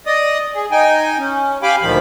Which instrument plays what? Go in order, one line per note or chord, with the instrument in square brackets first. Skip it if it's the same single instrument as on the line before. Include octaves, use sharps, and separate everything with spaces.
[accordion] D5 D#5 D#6
G#4
D#4 G5 G#5
C#4
G4 F5 G5 G#5 B5 D6
D2 A#2 D#3 F3 B5